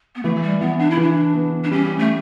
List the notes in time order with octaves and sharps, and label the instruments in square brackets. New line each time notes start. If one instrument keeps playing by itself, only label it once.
[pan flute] B3
[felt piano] E3 [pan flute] A3
[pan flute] G3
[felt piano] E3 [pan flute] B3
[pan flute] D4
E4
[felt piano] E3 [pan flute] D4
[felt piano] B3
[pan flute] D4
[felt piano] G3 [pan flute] C#4
[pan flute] A3